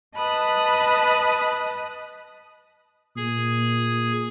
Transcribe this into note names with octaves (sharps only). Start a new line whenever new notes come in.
B4 D#5 A5 B5 D#6 F#6
A#2 G#4